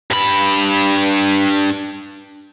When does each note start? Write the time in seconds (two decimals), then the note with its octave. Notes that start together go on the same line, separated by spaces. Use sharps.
0.11 G2 B5